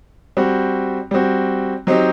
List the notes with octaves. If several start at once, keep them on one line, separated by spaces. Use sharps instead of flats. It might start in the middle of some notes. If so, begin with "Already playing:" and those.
G3 C4 F#4
G3 C4 F#4
F#3 C4 D#4 G4